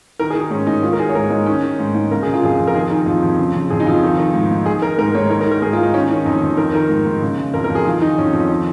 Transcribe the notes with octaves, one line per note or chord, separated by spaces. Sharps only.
D#3 A#4
G#4
D#3
G#4
G#2 C#4
G#2 D#4
D#3 F4
A#4
D#3 G#4
C#5
G#2 A#4
G#2 D#4
D#3 C#4
D#3
G#2
G#2
C#3 A#4
C#3 G#4
F4
F2 G#4
F2
A#4
D#3 G#4
D#3 D#4
F2 F4
F2
C#3
C#3
F2 G#4
D#4
F2 F4
D#3
D#3
G#2
G#2
D#3 G#4
D#3 A#4
G#2 A#4
G#2 C#5
D#3 A#4
A#4
D#3
A#4
G#2 G#4
F4
G#2 D#4
D#3 C#4
D#3 C#4
F2 D#4
F2
D#3 A#4
D#3 A#4
G#2
G#2
C#3
C#3
F2 A#4
A#4
F2
G#4
D#3 F4
D#3 D#4
F2 C#4
F2
D#3